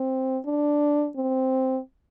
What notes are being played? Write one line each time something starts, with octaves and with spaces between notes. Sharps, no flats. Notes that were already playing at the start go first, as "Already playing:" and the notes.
Already playing: C4
D4
C4